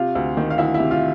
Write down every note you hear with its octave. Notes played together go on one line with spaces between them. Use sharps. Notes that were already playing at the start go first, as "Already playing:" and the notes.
Already playing: C3 F4 F5
D2
D#3
F5
D2 E4 E5
E4 E5
C3
F4 F5